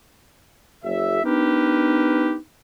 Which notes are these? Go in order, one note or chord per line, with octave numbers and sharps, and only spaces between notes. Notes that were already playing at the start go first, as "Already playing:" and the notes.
F#1 E5
B3 D4 D#4 G4 A#4 B4